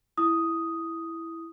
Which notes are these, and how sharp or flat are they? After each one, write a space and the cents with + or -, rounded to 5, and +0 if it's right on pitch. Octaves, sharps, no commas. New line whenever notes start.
E4 +0 D#6 +0